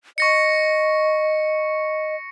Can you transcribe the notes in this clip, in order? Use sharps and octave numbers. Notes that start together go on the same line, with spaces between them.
D#5 C#6 A#6 C#7